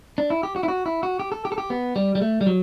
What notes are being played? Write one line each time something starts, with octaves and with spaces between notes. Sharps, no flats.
D4
E4
G4
F#4
E4
F#4
E4
F#4
G4
A4
G4
A4
G4
B3
G3
G3
A3
G3
F#3